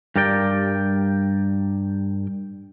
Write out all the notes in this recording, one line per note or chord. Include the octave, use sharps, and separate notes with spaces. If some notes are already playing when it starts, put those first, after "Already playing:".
G2 G4 A#4 D5 G5